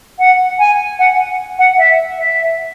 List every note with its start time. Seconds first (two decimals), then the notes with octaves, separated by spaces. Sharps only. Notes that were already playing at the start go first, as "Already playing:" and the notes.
0.19 F#5
0.59 G#5
0.99 F#5
1.58 F#5
1.78 E5
2.18 E5